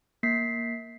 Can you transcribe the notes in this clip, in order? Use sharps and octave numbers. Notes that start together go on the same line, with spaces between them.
A#3 B6 C7